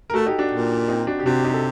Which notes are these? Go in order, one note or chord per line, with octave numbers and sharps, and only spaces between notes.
A#4
A3 F#4 A4
D#4 G4
D4 F#4
A#2
C4 D#4
D4 F#4
G4
C3 D4 F#4
D#4 G4
A4